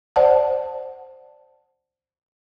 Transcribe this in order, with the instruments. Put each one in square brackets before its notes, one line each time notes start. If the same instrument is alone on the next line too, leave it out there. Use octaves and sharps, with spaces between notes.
[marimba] C5 D5 F#5 A5